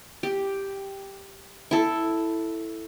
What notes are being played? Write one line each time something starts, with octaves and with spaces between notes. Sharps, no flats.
G4
E4 A4